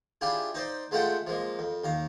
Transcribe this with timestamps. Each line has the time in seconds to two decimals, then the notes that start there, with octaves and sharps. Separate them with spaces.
0.21 D4 E4 F4 G4 G#4
0.54 D#4 C5 D5
0.91 G#3 A3 F4 A4 F#5 G5
1.27 F3 G#3 A#3
1.59 F2
1.84 D#2 F5 A#5